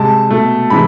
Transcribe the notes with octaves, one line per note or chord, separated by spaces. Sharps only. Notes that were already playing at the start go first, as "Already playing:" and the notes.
Already playing: C3 G#3 A5
B2 A3
C3 E3 G#3 B5